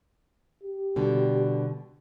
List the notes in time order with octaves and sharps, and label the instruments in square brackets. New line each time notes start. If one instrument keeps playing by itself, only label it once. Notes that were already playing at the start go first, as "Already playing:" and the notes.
[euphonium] G4
[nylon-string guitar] B2 D3 G3